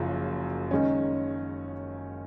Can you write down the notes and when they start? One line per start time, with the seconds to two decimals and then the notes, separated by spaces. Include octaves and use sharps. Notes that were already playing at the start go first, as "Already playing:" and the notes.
Already playing: F#1 F#2 C#3 F3
0.71 D#3 G#3 C#4